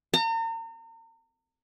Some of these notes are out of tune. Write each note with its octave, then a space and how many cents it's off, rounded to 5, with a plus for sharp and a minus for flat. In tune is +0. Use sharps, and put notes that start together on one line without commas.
A#5 -40